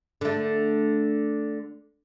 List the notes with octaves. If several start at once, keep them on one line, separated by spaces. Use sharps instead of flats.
D3 A3